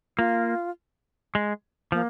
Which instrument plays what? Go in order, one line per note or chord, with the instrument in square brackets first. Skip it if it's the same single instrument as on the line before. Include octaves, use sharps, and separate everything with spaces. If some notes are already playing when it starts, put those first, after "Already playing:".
[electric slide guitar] A#3 [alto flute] F4
[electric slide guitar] G#3
[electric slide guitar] F3 [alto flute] A#3